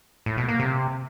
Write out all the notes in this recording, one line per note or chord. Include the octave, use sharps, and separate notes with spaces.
A2
B2
A#3
C3